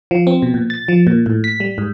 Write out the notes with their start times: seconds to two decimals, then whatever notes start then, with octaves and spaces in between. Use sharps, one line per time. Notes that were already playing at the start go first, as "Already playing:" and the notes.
0.11 F3
0.27 C4
0.42 B2
0.54 A#2
0.70 A6
0.88 F3
1.07 A#2
1.26 A2
1.44 B6
1.60 G3
1.78 G#2